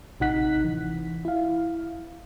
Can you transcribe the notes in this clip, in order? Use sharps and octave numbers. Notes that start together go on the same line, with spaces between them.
A1 C3 D#4 F#5 F#6 B6
E3
E4 F5